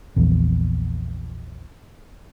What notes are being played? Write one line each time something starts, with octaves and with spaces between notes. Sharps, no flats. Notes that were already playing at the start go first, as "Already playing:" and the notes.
A#1 E2